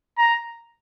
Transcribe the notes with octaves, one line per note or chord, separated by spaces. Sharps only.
A#5